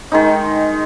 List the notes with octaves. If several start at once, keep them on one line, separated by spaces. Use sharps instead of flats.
D#3 G#3 D#4